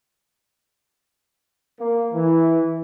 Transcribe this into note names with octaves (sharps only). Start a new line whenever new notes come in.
A#3
E3